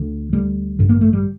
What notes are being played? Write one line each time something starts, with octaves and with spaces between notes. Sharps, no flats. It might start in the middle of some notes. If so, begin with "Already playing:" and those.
Already playing: D2 D3
D2 D3 G3
A1 G2 D3
A#3
A3
G3